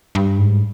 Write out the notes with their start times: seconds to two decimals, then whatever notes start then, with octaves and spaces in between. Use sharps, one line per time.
0.15 G2
0.38 G#2